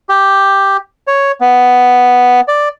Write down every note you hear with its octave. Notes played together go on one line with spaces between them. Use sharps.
G4
C#5
B3
D5